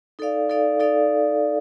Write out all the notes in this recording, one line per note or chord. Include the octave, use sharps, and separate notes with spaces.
D#4 A4 D5 F5
D#4 A4 D5 F5
D#4 A4 D5 F5